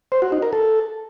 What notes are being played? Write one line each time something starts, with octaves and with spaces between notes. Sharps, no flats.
C5
F#4
D#4
A#4
A4